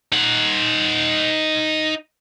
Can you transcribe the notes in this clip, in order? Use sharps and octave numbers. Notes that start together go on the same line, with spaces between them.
D#4 F#5